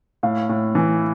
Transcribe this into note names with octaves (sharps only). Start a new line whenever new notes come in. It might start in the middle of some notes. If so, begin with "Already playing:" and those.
A2 F5
A2
E3